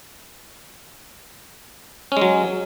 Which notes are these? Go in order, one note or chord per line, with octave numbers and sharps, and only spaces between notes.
F#3 G#3 C#4